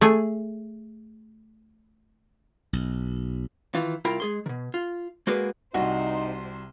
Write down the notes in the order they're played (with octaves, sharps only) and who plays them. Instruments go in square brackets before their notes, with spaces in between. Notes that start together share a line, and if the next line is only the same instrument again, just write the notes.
[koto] A3 G#4
[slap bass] B1
[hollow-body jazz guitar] D#3 E3 F4
C2 E4 F4 A#4 G5 B5
G#3 G#4 C6
B2 D#3
F4
G#3 A#3 F#4 G#4 B4 D5
[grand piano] C2 [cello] C3 C5 [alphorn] D#4 [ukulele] F#4